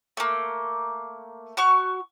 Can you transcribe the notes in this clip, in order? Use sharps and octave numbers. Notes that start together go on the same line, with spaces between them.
A3 A#3
F#4 C#6 F6